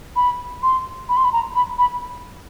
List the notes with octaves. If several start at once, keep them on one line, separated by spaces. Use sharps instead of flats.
B5
C6
B5
C6
B5
A#5
B5
B5